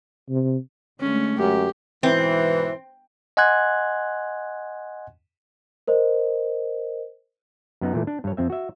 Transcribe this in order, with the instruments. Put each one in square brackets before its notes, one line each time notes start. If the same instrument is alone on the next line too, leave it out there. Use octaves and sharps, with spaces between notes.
[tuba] C3
[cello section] D3 G#3 A3 [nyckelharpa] C#4
[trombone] F#2 [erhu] G4
[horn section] G#2 B2 E3 [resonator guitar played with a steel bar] C4
[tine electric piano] D#5 F#5 G#5 C6 F#6 G#6
[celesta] A#4 C5 D#5
[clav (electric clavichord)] F#2 B3 D#4
A#2 E3 A3
D4
G2 C#5
F2 C4 E5
F#4 E5